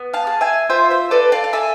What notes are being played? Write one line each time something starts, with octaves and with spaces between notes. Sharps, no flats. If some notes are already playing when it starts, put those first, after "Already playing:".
Already playing: B3
F5 A5
G#4
E5 G#5
F4 C5 E5
C5 E5
A4 B4 D5
D5 F5
F5
A4 E5 G#5